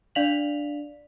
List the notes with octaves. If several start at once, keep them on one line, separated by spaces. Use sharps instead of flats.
D4 D5 F5 B6 F7 F#7